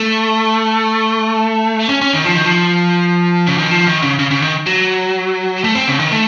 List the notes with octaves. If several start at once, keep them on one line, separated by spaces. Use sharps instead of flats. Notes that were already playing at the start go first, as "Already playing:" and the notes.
Already playing: A3
C#4
C#4
D#3
F3
D#3
F3
C#3
D#3
F3
D#3
C#3
C#3
C#3
D#3
F#3
A3
C4
C#3
D#3
A3